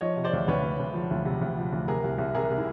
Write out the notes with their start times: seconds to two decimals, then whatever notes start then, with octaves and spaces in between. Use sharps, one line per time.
0.01 F3 C#5 D#5
0.16 C3
0.24 C5 D5
0.33 D2
0.48 D2 B4 C#5
0.63 D2
0.80 D2
0.94 F3
1.11 D2
1.25 C3
1.41 D2
1.57 F3
1.72 D2
1.87 C3 G#4 A#4
2.04 C2
2.18 C2
2.35 C3 G#4 A#4
2.50 C3
2.57 E4